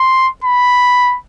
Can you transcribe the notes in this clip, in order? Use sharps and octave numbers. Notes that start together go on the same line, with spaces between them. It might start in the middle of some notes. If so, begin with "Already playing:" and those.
Already playing: C6
B5